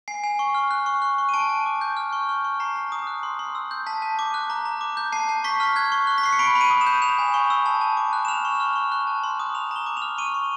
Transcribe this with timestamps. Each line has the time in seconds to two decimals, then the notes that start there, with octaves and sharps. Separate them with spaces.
0.08 G#5 C7
0.24 G#5
0.39 C#6
0.55 F6
0.71 F#6
0.86 C#6
1.02 F#6
1.18 C#6
1.29 D#7
1.34 A5 D7
1.49 A5
1.66 D6
1.81 G6
1.97 F6
2.13 C#6
2.29 F6
2.44 C#6
2.60 A#5 C7
2.76 A#5
2.92 D#6
3.07 F#6
3.23 C6
3.39 C6
3.55 E6
3.71 G6
3.87 A5 B6
4.02 A5
4.19 D6
4.34 F#6
4.50 A#5
4.65 A#5
4.81 D6
4.97 G6
5.13 A5 C7
5.29 A5
5.44 C#6 B6
5.60 F6
5.76 F#6 G#6
5.92 C#6
6.07 F#6
6.18 B6
6.23 C#6 C7
6.33 C#7
6.39 B5 D7
6.55 B5
6.61 D#7
6.70 D#6
6.81 E7
6.86 G6
7.02 G6 F7
7.19 G#5
7.34 C#6
7.50 E6
7.66 A5
7.81 A5
7.97 D6
8.13 F#6
8.25 E7
8.28 F6 F7
8.45 C#6
8.60 F6
8.75 C#6
8.92 F#6
9.07 A5
9.23 C6
9.40 D#6
9.55 A#5 F7
9.71 A#5 G7
9.86 D6
9.97 F6 F7
10.18 C#6 D#7
10.34 C#6